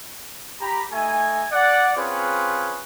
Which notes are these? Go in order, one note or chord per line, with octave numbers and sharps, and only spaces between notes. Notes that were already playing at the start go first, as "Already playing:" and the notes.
G4 A#5 B5
A3 D#4 E5 G#5
D5 F#5
C4 C#4 F4 G#4 B4 C#5